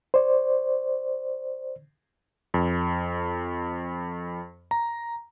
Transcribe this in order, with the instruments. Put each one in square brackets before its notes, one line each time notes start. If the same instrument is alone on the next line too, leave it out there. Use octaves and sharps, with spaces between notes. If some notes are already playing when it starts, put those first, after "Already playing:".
[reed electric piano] C5 D5
[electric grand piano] F2
A#5